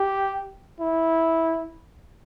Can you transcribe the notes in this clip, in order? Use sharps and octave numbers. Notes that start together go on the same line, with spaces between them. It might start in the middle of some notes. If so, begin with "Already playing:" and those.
Already playing: G4
E4